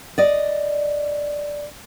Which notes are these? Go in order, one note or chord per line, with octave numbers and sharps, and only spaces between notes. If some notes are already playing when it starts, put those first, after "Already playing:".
D5 D#5